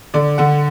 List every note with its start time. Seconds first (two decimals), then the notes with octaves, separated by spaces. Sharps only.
0.14 D3 D5
0.38 D3 F#5